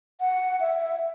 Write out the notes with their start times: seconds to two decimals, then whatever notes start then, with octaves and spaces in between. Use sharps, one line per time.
0.21 F#5
0.60 E5